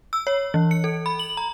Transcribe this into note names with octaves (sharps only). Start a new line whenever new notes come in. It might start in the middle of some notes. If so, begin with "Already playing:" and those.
E6
C#5
E3
C#7
A4
B5
F#7
A#5